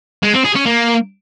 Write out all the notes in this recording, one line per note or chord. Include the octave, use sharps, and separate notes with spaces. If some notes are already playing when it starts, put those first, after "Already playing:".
G#3
C4
G#4
C#4
A#3